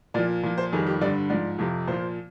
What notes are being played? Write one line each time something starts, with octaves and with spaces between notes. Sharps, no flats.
A#2 F3 D5
A#2 F3
C5
F2 D#3 G3 G#4
G4
G2 D3 G3 D5
G#2 F3 D5
F2 C3 F3
A#2 F3 C5